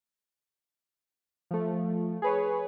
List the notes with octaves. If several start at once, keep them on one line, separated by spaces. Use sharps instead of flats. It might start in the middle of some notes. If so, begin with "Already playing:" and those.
F3 A3
G#4 B4 C#5